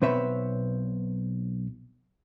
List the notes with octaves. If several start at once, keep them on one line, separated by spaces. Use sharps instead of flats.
B1 B2 C4 B4 C#5 E5